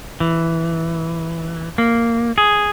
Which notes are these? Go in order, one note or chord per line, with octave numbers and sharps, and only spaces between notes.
E3
A#3
G#4